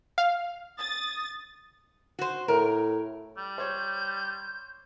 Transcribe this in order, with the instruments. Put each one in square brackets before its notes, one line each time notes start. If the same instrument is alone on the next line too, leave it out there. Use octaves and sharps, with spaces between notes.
[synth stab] F5
[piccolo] D#6 [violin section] A6
[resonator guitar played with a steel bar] F#4 C5
[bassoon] A2 [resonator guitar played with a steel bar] A#4
[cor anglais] G3 [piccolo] G6
[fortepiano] C5 C#5